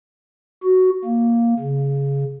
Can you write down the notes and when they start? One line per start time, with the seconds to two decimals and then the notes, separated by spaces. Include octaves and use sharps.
0.64 F#4
1.04 A#3
1.60 C#3